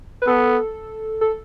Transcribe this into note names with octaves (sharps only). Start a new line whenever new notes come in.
B4
B3 A4
A4